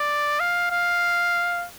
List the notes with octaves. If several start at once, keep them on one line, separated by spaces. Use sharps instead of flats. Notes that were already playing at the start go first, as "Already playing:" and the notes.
Already playing: D5
F5
F5